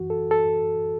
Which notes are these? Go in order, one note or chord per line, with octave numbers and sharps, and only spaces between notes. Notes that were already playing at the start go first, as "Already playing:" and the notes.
Already playing: F#2 E3 F#4
A4
A4